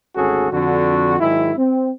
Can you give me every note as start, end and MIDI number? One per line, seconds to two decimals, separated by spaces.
0.16 0.50 32
0.16 0.50 38
0.16 0.50 61
0.16 0.50 66
0.16 0.50 68
0.16 0.50 69
0.52 1.16 41
0.52 1.16 50
0.52 1.16 66
1.20 1.52 44
1.20 1.52 51
1.20 1.52 54
1.20 1.52 56
1.20 1.52 64
1.57 1.90 60